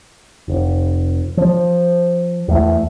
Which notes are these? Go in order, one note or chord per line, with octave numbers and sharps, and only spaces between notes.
F1
F3
E2 A3